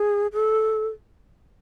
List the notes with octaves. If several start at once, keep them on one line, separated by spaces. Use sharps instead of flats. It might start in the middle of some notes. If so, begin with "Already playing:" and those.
Already playing: G#4
A4